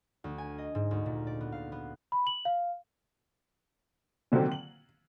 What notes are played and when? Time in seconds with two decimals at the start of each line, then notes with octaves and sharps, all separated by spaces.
0.24 D2
0.38 G#5
0.58 D#5
0.75 G#2
0.91 D2
1.06 A#2
1.27 D5
1.41 B3
1.52 F5
1.72 B3
2.12 B5
2.27 F#7
2.45 F5
4.32 A#2 D3 D#3 F#3 C4
4.52 F#7